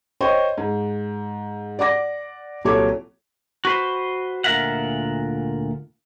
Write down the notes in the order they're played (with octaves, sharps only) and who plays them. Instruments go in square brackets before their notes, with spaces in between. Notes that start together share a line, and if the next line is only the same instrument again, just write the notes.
[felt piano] C5 C#5 D#5 G5 C#6
G#2
D5 F#5 D6 A#6
C2 A#2 F#3 A4 C#5 D6
[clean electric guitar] F#4 B4 C5
D2 A#2 F4 A#4 E5 F#5